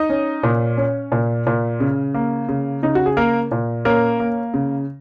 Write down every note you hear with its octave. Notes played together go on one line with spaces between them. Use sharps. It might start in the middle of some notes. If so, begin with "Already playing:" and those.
Already playing: D#4 D#5
C#4
A#2
C#4
A#2
A#2
C#3
A#3
C#3
C#3 D#4
F#4
G#4
A#3 A#4
A#2
A#3 C#4 A#4
A#3
C#3